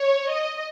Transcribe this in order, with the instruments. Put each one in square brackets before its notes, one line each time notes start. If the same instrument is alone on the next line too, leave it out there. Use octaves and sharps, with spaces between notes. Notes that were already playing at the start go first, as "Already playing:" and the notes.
Already playing: [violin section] C#5
D#5